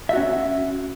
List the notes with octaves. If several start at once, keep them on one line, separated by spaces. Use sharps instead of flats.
C#4 F#4 E5